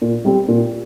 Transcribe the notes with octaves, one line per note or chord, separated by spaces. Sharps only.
A#2
G3 C4 G4
A#2